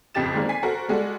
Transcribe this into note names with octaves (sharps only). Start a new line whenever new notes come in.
A1 F2 C#3 G4 A6 E7
D#3 G3 G#3 A#3 C4
G#5 B6 C7
F#4 A4 A#4 C5
G3 G#3 F#4 A4